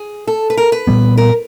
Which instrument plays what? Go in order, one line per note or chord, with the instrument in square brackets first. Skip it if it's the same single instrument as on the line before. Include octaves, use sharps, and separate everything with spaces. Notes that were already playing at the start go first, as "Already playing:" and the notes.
Already playing: [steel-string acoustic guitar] G#4
A4
B4
A#4
B4
[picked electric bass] A#2 G3 B3
[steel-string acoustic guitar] A#4